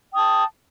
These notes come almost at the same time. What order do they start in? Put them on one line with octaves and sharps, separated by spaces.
G5 D#6 A5